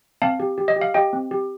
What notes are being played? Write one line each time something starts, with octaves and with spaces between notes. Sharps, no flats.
C4 F5 A5
G4
G4
D#5
G4
F5
G4 D#5 G5
C4
G4